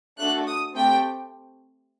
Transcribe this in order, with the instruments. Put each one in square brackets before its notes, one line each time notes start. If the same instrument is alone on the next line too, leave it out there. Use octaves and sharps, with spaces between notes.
[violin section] A3 D4 F#4 A4 F#6
D#6
A3 C4 G4 G5